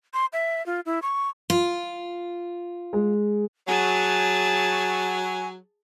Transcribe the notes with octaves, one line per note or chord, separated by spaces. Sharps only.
C6
E5
F4
E4
C#6
F4
G#3
F#3 G#4 G#5 A5